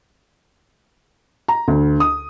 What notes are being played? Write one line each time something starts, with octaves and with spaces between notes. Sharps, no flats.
A#5
D2
D#6